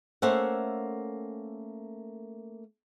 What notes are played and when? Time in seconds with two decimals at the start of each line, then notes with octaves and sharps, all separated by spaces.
0.22 A3 A#3 C#4 C5 E5 F#5